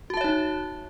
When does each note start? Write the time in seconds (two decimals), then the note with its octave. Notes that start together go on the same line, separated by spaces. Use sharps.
0.10 F#4
0.14 A5
0.17 E5
0.21 C#5
0.24 D#4